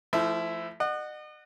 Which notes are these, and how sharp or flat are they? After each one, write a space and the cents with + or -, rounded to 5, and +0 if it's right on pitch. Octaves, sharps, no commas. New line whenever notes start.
F3 -25 A3 +0 E4 +5
D#5 -40 F#5 +0